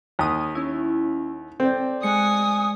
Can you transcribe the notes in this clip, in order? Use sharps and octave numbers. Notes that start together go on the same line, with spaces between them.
D#2 A#5 D#6
C#4 E4
C4 A4 D5 G6
G#3 G#5 D#6 F#6 C#7